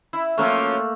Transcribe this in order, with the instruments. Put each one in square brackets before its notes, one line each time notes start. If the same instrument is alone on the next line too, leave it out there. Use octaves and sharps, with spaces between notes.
[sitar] E4
[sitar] F3 F#3 C#4 [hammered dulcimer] A3 A#3